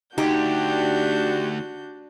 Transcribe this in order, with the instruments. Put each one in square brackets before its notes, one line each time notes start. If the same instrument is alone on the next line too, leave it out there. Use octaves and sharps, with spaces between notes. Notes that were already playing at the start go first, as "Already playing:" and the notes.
[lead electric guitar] D2 [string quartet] D4 F#4 G6 [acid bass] D#4 [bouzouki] G4